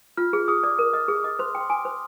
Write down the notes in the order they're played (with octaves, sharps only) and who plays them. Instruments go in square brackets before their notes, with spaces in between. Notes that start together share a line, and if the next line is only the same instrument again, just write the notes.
[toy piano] F4 [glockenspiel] F6
[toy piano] G#4
[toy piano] G#4 [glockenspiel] D#6
[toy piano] D5 [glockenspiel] D6
[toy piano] A#4 [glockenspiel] D#6
[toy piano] D#5 [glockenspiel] F6
[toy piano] G#4 [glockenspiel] D#6
[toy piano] D#5 [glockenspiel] D6
[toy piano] C5 [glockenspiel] C6
[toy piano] G5
[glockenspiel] C6
[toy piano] G#5 [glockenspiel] D6
[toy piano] C5